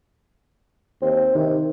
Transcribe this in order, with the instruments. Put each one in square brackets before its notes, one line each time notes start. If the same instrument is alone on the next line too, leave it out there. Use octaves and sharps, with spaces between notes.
[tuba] D#2 [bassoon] C4
[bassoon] C3 [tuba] D#3